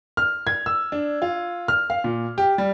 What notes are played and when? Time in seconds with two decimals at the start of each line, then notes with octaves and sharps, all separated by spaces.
0.17 F6
0.47 G#6
0.66 E6
0.92 D4
1.22 F4
1.68 F6
1.90 F5
2.04 A#2
2.38 G4
2.58 G3